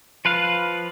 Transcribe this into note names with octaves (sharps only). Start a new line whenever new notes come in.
F3 B4 F5